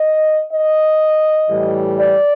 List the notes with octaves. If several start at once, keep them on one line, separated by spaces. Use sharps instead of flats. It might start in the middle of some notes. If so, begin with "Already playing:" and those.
Already playing: D#5
D#5
A2 E3 G3
D5